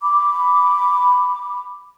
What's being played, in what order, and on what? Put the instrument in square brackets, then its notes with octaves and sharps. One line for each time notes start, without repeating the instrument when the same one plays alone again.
[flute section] B5 D6